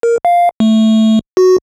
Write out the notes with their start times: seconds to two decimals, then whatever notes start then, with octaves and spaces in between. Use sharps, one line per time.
0.03 A#4
0.25 F5
0.60 A3
1.37 F#4